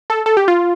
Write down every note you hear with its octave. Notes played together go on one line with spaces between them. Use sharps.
A4
A4
G4
F4